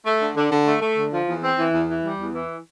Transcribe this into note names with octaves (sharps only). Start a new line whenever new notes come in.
A3
D3
D3
D3
A3
A3
D3
F3
E2
C4
E3
E2
E3
G3
E2
E3